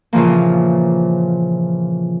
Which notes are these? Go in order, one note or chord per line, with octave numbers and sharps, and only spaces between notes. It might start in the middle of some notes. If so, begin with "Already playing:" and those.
A#2 C#3 E3 F3 A#3